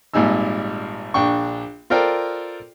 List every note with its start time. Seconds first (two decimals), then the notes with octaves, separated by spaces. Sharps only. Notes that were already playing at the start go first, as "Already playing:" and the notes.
0.14 G#1 A#2 G3 D#4 G#5 E6
1.14 A#1 D4 G5 C#6
1.90 F4 A4 A#4 C5 D5 G5